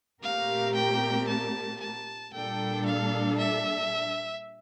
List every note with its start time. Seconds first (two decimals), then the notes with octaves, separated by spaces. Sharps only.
0.22 A#2 A3 C4 G4 A#4 F5
0.75 G5
1.28 A5
1.80 A5
2.33 A#2 G3 D4 A4 G5
2.86 F5
3.38 E5